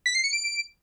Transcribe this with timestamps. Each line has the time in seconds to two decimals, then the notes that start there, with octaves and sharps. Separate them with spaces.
0.06 B6
0.15 C7
0.24 C#7
0.33 D7